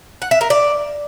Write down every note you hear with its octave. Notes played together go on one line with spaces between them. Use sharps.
F#5
E5
A#4
D5